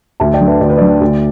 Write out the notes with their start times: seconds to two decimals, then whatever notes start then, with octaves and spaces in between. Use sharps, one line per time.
0.20 D2 E5 A5
0.34 D5 G5
0.41 D3
0.47 B4 E5
0.61 D2 D5
0.70 B4
0.78 D3 D5
1.01 D2